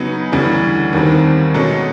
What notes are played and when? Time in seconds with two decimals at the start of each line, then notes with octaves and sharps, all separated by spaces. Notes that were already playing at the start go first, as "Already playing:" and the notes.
Already playing: C#3 F#3 B3 D#4 G#4
0.32 D2 C#3 E3 G3
0.93 D#2 D#3 G3 C4
1.54 B2 G#3 C#4 F#4 A4